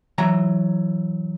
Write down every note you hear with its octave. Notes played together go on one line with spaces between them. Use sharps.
E3 F#3 A#5